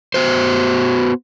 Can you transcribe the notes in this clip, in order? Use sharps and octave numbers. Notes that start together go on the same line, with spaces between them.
B3 F#4 C5